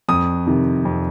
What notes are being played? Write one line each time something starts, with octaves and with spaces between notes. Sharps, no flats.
F2 D#6
C3 D#3
F2